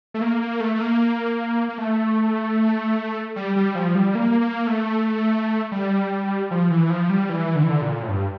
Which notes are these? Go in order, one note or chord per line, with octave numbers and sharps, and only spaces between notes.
A3
A#3
A#3
A3
A3
A#3
A#3
A3
G3
G3
F3
G3
A#3
A#3
A3
G3
F3
E3
F3
G3
E3
D3
E3
D3
A#2
A2
G2